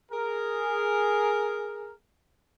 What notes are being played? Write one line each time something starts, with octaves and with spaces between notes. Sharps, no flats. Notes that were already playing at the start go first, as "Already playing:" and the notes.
G#4 A#4